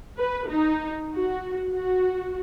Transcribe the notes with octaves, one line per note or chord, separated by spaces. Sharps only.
B4
D#4
F#4
F#4